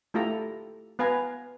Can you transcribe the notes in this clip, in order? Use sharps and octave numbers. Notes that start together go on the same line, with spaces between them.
A3 E4 F4 G4 A4 A#5
B3 B4 F5 G#5 A#5